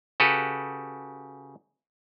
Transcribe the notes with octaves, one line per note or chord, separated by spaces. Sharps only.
C#3 F#4 G4 A4 B4